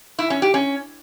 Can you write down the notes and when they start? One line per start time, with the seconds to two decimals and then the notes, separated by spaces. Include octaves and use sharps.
0.19 E4
0.30 C#4
0.42 G4
0.54 C#4